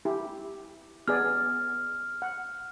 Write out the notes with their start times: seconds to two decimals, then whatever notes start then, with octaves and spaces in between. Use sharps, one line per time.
0.05 E4 G4
1.08 B3 G#4 D5 F6
2.22 F#5